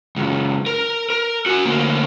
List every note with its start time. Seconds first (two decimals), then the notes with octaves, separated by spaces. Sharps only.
0.16 C#2 F#2
0.66 A#4
1.10 A#4
1.46 F#4 G#5
1.65 D2 A#3